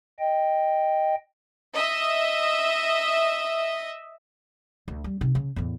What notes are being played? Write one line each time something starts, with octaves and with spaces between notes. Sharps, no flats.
D#5 G5
D#5 E5
D2
G3
C3 D#4
C#3
E2 A2